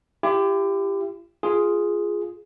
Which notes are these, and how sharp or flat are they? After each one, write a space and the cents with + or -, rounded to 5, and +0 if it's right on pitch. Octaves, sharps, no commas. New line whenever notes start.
E4 +45 G4 +10
F4 +0 G#4 +0